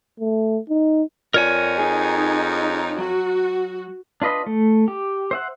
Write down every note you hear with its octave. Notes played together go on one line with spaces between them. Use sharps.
A3
D#4
F2 F4 A#4 C#5 D5 G#5
D#4 G#4
F#3 F#4
D4 F4 B4 D#5 B5
A3
G4
C5 E5 F#5